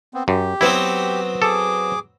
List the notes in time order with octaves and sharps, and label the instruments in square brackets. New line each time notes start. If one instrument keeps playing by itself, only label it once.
[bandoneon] B3 C4
[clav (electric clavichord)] F#2 [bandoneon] G4
[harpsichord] F#3 B3 C4 [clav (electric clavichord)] E4
[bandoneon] G#4 D6 [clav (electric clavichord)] A4